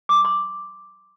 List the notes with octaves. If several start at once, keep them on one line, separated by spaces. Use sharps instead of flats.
D6
C6